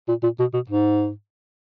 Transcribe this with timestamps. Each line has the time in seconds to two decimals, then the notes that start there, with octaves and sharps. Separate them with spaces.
0.08 A#2
0.23 A#2
0.39 B2
0.54 B2
0.69 G#2